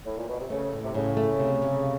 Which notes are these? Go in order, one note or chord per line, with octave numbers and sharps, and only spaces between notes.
A2
A#2
B2
C3
C#3 A3
A2
C3
A2 C#3
A3
C3
C3